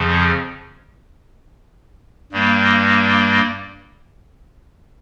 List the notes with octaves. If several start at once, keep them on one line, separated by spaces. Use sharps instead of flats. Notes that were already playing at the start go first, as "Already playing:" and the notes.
Already playing: F2 C#3 F3
G2 G3 A#3